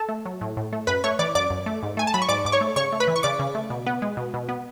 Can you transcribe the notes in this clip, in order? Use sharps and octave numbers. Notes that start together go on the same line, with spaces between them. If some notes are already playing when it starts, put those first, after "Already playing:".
Already playing: A4 A5
A3
F#3
A2
A2
A3
F#2 B4 B5
A3 C#5 C#6
E3 D5 D6
F#2 D5 D6
F#2
A3
G#2
A3 G#5
A5
F#3 B5
C#6
G#2 D5 D6
G#2 D6
C#5 C#6
A3
C#3 C#5 C#6
A3
B4 B5
E3
C#6
C#3 D5 D6
C#3
A3
B2
B3
G#3
B2
B2
B3